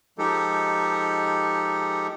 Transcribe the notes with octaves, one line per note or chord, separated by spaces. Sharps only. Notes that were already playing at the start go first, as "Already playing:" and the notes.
F3 G#3 D#4 G4 A4